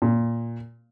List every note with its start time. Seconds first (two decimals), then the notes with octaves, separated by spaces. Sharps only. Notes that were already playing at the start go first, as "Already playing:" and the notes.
0.02 A#2